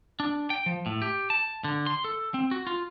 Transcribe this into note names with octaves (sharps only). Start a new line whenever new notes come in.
D4
G5
F3
A2
G4
A5
D3
C6
A4
C4
F#4
F4